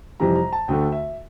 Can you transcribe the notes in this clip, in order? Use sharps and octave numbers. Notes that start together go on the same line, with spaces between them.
F2 C3 E3 G3 A#5
A#5
A5
D2 D3 A3 G5
E5